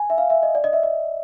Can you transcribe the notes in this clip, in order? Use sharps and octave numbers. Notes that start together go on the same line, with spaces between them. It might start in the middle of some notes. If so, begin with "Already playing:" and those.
Already playing: G#5
E5
F5
E5
D#5
D5
D#5
E5
D#5